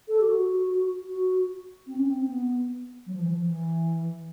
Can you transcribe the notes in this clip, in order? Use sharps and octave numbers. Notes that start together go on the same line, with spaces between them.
A4
G4
F#4
F#4
C4
C#4
C4
B3
F#3
F3
E3
F3
E3